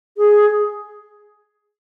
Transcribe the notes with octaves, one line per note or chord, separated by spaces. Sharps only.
G#4